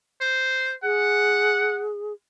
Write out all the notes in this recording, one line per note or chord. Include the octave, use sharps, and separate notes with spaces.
C5
G#4 F#5